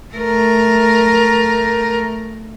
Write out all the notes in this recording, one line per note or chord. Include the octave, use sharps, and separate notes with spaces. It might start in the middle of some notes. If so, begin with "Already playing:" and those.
A3 A#4